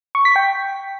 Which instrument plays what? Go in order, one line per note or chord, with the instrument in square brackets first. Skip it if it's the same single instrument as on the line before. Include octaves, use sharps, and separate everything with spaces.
[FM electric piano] C#6
B6
G5